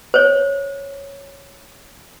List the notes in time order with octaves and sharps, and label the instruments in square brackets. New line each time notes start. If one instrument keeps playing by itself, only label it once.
[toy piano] C5 C#5